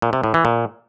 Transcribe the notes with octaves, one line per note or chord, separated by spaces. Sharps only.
A#2
C3
A2
E3
A#2